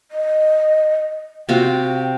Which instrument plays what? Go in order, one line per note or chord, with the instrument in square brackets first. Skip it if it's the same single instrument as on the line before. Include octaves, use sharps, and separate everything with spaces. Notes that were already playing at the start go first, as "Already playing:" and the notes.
[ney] D#5
[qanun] C3 F4 F#4 [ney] G5